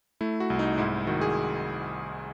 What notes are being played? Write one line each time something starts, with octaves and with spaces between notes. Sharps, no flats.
A3 E4
F#4
C2
D#4
G#2 E4
D#3 F#4
G#4